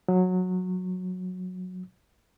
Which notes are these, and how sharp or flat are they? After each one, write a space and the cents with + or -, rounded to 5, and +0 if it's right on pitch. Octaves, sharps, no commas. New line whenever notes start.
F#3 -15